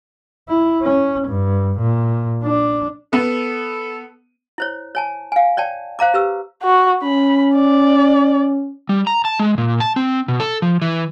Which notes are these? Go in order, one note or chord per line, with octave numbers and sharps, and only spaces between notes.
E4
C#4
G2
A#2
D4
B3 A4
E4 C5 C#5
C#5 G#5 A5
F5 G#5
C#5 D5 G5 A5
C5 F5 A#5 D6
G4 B4 E6
F#4
C#4 B5
D5
G3
A#5
A5
G#3
A#2
A5
C4
B2
A4
F3
E3